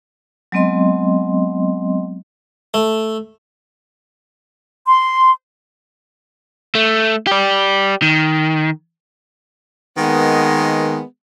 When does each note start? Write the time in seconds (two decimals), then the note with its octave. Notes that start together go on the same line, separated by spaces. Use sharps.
0.52 F#3 G#3 B3 C4 D#5 C6
2.74 A3
4.86 C6
6.75 A3
7.27 G4 D5
8.02 D#3
9.98 D#3 G#3 A#3 B3